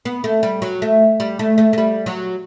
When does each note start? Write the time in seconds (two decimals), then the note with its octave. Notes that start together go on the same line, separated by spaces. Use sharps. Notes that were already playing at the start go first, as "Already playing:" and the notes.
0.05 B3
0.24 A3
0.43 G3
0.62 F#3
0.82 A3
1.20 G3
1.39 A3
1.58 A3
1.73 A3
1.78 G3
2.06 F#3